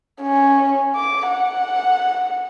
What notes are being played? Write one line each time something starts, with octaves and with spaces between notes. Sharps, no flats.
C#4
D6
F#5